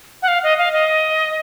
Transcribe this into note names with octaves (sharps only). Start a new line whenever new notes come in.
F#5
F5
D#5
F5
D#5